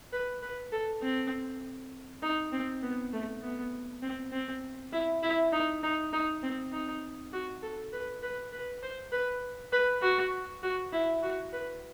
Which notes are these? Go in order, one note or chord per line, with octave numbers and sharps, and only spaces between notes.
B4
B4
A4
C4
D#4
C4
B3
A3
B3
C4
C4
E4
E4
D#4
D#4
D#4
C4
D#4
F#4
A4
B4
B4
B4
C5
B4
B4
F#4
F#4
E4
F#4
B4